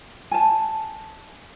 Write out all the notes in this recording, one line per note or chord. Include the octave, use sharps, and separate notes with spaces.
G#5 A5